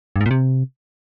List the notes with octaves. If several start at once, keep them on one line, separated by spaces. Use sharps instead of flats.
G2
G#2
A#2
C3